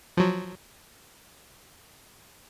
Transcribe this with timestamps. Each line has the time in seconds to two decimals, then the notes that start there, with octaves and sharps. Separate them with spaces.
0.17 F3 F#3